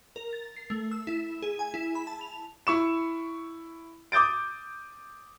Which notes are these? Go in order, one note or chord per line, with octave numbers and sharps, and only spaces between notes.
A#4
A6
C7
A3
E6
E4
G#4
G#5
E4
B5
A5
F7
E4 C#6 E7
D6 D#6 G6 A6 D7